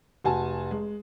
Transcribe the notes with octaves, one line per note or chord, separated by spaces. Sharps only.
F1 F#4 G#5 A5
G#3